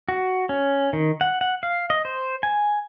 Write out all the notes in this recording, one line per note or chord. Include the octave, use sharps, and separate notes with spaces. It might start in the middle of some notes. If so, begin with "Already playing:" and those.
F#4
C#4
D#3
F#5
F#5
F5
D#5
C5
G#5